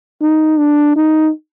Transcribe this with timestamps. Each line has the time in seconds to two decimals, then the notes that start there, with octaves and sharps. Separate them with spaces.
0.22 D#4
0.59 D4
0.96 D#4